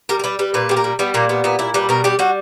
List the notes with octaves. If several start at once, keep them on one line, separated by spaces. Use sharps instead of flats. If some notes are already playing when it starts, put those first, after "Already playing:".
G3 A#4
A#4
G3 B4
G3 B4
A#2 B4
G3 G4
A#4
G3
G3 B3
A#2 A#3
G3 B3
A#2 B3
A#2 E4
G3 B4
B2 A#4
G3 G4
G3 F#4